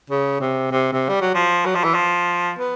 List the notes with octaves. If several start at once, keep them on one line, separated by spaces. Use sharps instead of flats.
C#3
C3
C3
C3
G3
F#3
F3
F#3
F3
E3
F3
B3